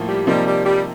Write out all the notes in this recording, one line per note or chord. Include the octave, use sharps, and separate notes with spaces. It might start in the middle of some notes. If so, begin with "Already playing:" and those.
Already playing: A2 F3 A#3
G3
C3 F3 G3 A#3 D#4
G3
G3